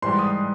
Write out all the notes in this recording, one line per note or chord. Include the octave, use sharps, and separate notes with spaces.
G#2 E3 G3 C6
D#6